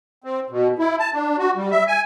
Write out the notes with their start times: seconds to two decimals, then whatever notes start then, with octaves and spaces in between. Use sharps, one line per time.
0.24 C4
0.50 B2
0.79 E4
0.99 A5
1.14 D4
1.39 F#4
1.56 G3
1.71 E5
1.87 G#5